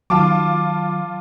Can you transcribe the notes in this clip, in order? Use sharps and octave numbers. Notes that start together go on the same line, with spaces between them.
D#3 F#3 F4 A5 D6